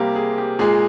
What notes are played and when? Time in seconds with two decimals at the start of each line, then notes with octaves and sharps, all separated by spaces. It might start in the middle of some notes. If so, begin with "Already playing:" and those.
Already playing: C3 G3 A#3 G4 C5
0.15 G#4
0.38 G4
0.59 A#2 G#3 G#4